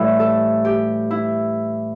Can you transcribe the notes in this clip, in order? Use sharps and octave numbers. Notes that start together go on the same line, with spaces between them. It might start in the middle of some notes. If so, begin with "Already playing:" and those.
Already playing: A2 E3 G3 E4
A4
G4
E4